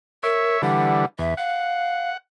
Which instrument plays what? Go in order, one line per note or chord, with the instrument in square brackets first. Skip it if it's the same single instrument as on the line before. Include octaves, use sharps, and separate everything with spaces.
[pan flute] A#4 [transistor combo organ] C#5 E5
[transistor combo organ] D3 E3 G3 [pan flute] F#5
[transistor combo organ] E2 [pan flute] E5
[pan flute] F5 [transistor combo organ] F#5